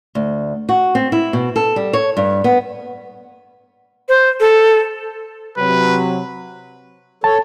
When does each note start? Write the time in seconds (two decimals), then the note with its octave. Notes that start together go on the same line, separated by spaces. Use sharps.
0.15 D2
0.69 F#4
0.95 C4
1.12 E4
1.33 B2
1.56 A4
1.76 G3
1.93 C#5
2.17 G2
2.44 B3
4.09 C5
4.40 A4
5.58 C3 F#3 B4
7.24 A4 C#5 A5